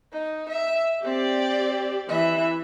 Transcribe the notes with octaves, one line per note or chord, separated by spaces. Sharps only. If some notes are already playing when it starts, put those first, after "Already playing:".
D#4
E5
C4 G4 D5
E3 E5